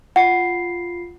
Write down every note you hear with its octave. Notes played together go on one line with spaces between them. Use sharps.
F4 F#5 C7